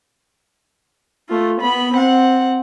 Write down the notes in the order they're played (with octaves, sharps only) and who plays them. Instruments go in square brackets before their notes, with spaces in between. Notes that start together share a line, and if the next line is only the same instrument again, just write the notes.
[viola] A3 F4
B3 B5
C4 F#5